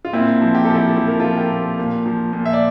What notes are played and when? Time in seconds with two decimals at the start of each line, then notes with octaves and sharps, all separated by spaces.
0.05 F4
0.13 A#2 C4 E4
0.42 F3
0.55 G4
0.65 F3 A4
0.75 E4 G4
0.96 F3 A4
1.08 A#4
1.20 F3 F4 A4
1.37 G4 A#4
1.51 A#2
1.79 A#2
2.06 F3
2.33 A#2
2.46 E5
2.53 D5